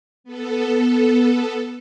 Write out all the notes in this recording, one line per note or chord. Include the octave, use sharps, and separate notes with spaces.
B3 A4